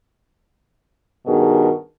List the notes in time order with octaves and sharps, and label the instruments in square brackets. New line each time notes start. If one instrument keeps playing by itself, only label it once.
[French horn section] G2 B2 D#3 G#4 A#4